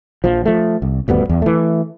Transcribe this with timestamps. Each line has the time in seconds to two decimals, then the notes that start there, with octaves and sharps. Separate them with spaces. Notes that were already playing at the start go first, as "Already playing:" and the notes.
0.24 A#1 F3
0.45 F3 A3
0.82 C2
1.08 D#1 D2 G2 B3
1.29 E2
1.42 E3 A3